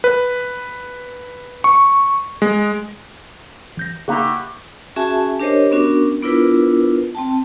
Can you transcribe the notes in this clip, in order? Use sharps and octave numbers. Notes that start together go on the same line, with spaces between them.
B4
C#6
G#3
A1 G6 A#6
C#3 A#3 D#4 E4 F#4 G4
C#4 F#4 G#4 E5 G#5 A5
D4 G4 A#4 C5 C#5 D#5
B3 C#4 D4 F#4 A#4
B3 D4 E4 F4 A#4 B4
C4 G5 A5